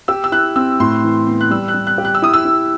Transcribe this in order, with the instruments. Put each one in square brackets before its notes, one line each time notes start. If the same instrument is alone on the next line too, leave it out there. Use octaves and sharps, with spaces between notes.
[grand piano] G4 [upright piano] E6
[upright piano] E6
[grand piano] E4 [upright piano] F#6
[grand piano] C4 [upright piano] E6
[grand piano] A2 [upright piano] C6
[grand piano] E3
B3
[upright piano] F#6
[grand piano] G3 [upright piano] E6
[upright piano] F#6
[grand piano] G3
[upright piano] F#6
[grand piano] G4
[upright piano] F#6
E6
[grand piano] E4 [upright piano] D#6
[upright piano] E6
[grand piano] E4